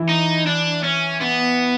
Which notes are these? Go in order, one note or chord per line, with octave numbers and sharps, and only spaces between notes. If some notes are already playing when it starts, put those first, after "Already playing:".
Already playing: E3 E4
D#4
D4
C#4
B3